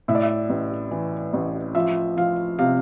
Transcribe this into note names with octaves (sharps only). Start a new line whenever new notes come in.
A2 E5
D5
E5
A1
E3
A1
F3 E5
F3 F5
C3 F5